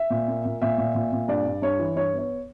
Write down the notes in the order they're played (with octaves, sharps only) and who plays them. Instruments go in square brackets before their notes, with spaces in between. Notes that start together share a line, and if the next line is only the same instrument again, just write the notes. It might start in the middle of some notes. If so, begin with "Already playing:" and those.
Already playing: [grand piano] E5
A#2
A#3
A#2
A#2 E5
A#2
A#2
A#2
G2 D5
G2
G2 C#5
E3
G2 C#5
B3
C#5